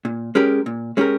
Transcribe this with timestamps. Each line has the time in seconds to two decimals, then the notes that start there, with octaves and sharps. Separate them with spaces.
0.05 A#2
0.35 G#3 C#4 G4 A#4
0.66 A#2
0.97 G#3 C#4 G4 A#4